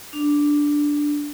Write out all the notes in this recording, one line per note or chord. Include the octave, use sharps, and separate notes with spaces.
D4